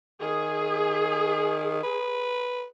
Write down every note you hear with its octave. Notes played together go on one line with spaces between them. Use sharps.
D#3 G#4
B4